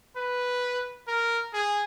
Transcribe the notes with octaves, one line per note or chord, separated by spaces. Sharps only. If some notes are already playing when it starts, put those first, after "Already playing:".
B4
A#4
G#4